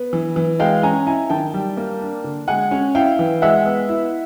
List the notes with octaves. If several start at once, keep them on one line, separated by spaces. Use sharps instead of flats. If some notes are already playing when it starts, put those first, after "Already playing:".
Already playing: B3
E3
E3
G#3 F5 G5
C#4 G#5 A#5
E4 G#5 A#5
D#3 G5 A5
G3
A#3
D4
D3
G#3 F#5 G#5
C#4
E4 F5 G5
E3
G#3 E5 F#5
B3
E4